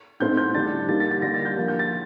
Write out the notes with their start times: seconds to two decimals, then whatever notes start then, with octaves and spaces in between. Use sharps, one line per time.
0.20 A2 A3 C4 D#4 G6
0.37 G6
0.54 D3 G3 D4 A6
0.88 D3 G3 A#3 D#4 A6
1.00 A6
1.11 A6
1.22 D3 G3 A#3 A#6
1.34 A6
1.45 G6
1.56 F3 A#3 D4
1.68 G6
1.79 A6